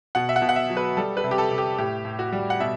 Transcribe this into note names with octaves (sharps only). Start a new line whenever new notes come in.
B2 F#5
E5
F#5
B2
F#5
E5
F#3
B4
G3 A4
B4
C3
G4
A4
C3
G4
A2 G4
A2
F#4
G3
F#5
B2 E5